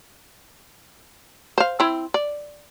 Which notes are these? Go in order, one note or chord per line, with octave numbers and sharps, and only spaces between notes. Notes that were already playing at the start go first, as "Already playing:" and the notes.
C5 F5
C4 E4
D5